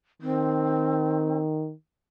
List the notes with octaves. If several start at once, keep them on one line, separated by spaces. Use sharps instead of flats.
D#3 C4